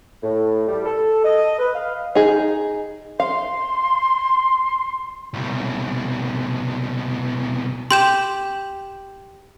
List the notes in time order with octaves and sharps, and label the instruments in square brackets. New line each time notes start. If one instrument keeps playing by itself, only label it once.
[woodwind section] A2
G3
A4
D#5
B4
F5
[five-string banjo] D#4 G#4
[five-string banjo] F5 [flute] C6
[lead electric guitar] C2 B2
[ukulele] G4 [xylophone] C6 G6 E7